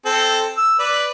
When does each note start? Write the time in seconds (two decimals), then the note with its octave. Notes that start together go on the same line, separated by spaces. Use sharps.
0.06 C4 A4
0.57 E6
0.79 B4 D5